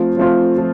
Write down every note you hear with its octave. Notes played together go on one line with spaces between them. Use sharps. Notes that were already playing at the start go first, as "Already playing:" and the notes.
Already playing: F3 A3 C4 F4
F3 A3 C4 F4
F3